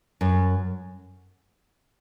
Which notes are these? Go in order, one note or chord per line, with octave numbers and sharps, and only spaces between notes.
F#2